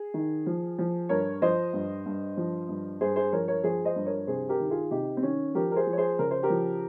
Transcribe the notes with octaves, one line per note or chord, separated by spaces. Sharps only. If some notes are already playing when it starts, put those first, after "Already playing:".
Already playing: G#4
D#3
F3
F3
G2 A#4 C#5
F3 C5 D#5
G2
G2
F3
G2
G2 G#4 C5
G#4 C5
F3 A#4 C#5
A#4 C#5
F3 G#4 C5
C5 D#5
G2
A#4 C#5
C3 G#4 C5
G4 A#4
D#3
F4 G#4
C3 D#4 G4
C4
D#3 C#4
F3 G4 A#4
A#4
G#4 C5
F3
C#5
G#4 C5
C#3 A#4
C5
G4 A#4
F3